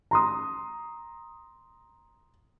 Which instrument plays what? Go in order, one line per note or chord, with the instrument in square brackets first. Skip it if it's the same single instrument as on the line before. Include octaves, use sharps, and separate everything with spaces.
[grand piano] A#5 C6 D#6